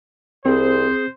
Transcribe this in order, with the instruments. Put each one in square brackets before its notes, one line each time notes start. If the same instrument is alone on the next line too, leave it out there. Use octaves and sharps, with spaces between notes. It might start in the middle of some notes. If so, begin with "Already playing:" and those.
[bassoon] C2 [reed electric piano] C4 [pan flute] G#4 [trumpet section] C5